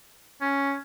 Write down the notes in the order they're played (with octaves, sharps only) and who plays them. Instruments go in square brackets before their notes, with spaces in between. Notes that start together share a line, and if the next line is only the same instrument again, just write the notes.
[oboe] C#4